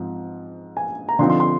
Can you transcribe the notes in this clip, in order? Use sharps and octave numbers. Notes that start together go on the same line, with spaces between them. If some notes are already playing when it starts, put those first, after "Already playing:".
Already playing: G#2 F3 C4
G#5
A#5
D3 F3 C4 D#4 C6
C6
C6